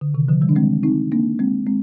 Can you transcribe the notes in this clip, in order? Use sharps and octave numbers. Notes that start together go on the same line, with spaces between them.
D3
C3 D#3
D3 F3
D#3 G3
D4
G#3 C4
C4 D#4
A#3 D4
G#3 C4
G#3 C4